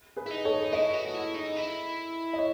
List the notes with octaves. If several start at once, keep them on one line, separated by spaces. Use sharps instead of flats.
G#4 B4
E4
D#4
A4 C#5
E4 B4 D#5
F#4
F#4
E4
D#4
E4
D#5
C#5